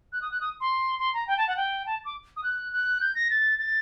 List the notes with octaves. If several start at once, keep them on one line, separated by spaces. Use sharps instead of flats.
F#6
D#6
F#6
D#6
C6
C6
A#5
G5
A5
F#5
G5
A5
D6
D#6
F#6
F#6
G6
A#6
A6
A6